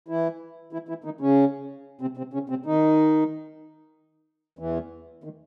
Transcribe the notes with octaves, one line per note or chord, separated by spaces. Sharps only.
E3 E4
E3 E4
E3 E4
D#3 D#4
C#3 C#4
C3 C4
C3 C4
C#3 C#4
C3 C4
D#3 D#4
E2 E3
D#3